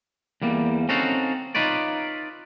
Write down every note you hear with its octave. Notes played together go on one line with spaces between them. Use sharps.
E2 G3 A#3
C4 C#4 D#4 F#4 A4 F5
D#4 F4 B4 C#5 D5